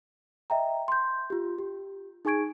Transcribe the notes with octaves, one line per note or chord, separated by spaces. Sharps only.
D#5 E5 G5 A#5
C6 G6
F4 G4
G4
D#4 G#4 G#5 C#6 G#6 D7